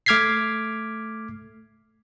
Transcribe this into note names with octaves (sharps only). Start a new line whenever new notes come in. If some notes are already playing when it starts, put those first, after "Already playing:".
A3 D6 F6 G#6 B6 C7